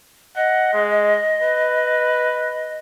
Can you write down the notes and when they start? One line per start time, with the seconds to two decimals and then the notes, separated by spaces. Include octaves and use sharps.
0.36 D#5 F#5
0.74 G#3
1.43 B4